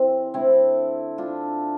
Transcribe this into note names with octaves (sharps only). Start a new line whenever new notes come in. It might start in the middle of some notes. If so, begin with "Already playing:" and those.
Already playing: C3 E3 A3 C4
D3 A3 C4 E4
D4 F4